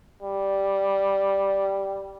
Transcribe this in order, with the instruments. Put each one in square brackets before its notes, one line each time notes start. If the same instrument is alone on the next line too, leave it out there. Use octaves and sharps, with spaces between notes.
[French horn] G3